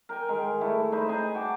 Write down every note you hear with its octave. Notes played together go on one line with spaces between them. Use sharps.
A#4 G5 G#5
D#3 G#3 A#4
A3 E4
D#4 B4 C5 D#5
G#4 D#5 G#5 A#5
F#4 G5 A5 D6